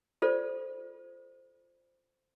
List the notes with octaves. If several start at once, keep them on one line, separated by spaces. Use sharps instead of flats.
F4 A4 C5 D5